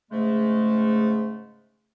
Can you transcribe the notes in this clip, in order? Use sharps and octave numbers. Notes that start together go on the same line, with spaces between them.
G#2 C#3 G#3 A3